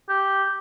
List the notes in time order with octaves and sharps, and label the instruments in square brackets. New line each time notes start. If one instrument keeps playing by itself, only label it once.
[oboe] G4